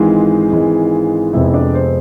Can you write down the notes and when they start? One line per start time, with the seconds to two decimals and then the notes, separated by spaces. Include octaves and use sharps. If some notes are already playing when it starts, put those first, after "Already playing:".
Already playing: G#1 G#2 E3 G#3 F4 F5
0.52 G#1 G#2 E3 G#3
1.33 F1 F2 C3 G#3 B3 E4 E5
1.54 D4 D5
1.74 C4 C5